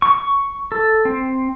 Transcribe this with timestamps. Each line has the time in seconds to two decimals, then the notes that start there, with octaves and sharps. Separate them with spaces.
0.02 C#6
0.18 C#6
0.72 A4
1.05 C4